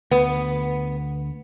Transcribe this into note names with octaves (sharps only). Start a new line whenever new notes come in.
D2 B3